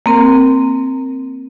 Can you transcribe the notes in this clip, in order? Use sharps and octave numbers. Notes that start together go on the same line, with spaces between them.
A#3 C4 A#4